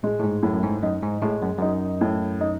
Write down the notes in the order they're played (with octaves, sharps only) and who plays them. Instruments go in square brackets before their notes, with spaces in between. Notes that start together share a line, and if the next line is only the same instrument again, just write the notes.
[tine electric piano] A2 [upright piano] G#3
[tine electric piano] A2
G#2
[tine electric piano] F#2 [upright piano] A2
[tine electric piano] F#2
G#2
[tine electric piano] F#2 [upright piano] D#4
[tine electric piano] G#2
[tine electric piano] A2 [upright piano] G#3
[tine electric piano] F#2
[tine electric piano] F#2 [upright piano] D#4
[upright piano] A2
D#4